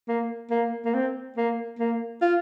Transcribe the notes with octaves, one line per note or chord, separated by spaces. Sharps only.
A#3
A#3
A#3
C4
A#3
A#3
F4